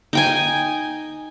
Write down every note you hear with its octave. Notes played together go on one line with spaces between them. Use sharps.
D#4 G5 G#5